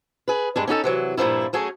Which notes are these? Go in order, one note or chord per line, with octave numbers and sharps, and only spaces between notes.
G#4 B4
G2 G#3 D4
C#4 D#4 F#4 A4
C3 E3 F#3
G2 A#2 D#3 F3 E4
F#3 A3 C#4 G#4